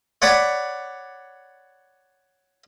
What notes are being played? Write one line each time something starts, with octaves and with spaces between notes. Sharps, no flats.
C#5 D5 F#5 B5 D6